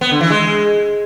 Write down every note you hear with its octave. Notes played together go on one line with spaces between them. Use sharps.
B3
D3
E3
G#3